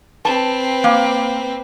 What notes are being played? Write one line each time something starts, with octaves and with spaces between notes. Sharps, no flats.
C4 B4 A5
A#3